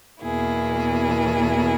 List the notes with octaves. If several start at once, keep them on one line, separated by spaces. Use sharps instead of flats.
E2 B2 A#3 E4 G#4